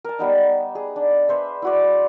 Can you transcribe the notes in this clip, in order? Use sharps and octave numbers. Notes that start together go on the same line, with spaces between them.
A#4 A5
G3 B3 D#4
G#4
D4
B4 C5 E5
E4 F#4 D5